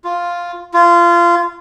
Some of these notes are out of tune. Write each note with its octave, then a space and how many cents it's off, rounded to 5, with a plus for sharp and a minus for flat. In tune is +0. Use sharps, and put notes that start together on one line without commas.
F4 +0
F4 -20